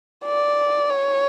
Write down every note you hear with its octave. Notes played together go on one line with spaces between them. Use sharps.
D5
C#5